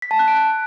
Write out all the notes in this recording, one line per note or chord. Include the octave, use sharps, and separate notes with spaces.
B6
A5
F#6
D7